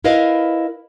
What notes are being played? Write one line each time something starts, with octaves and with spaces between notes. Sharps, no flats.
E4 A#4 B4 D#5 F5